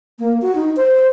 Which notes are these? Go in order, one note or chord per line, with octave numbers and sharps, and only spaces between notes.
A#3
F#4
D#4
C5